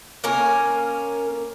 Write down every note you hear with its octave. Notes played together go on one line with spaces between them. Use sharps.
A#3 C#4 A#4 G#5